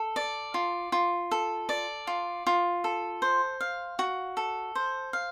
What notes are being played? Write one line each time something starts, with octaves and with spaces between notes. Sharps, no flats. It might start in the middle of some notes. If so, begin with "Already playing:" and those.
Already playing: A4
D5
F4
F4
A4
D5
F4
F4
A4
C5
F5
F#4
A4
C5
F5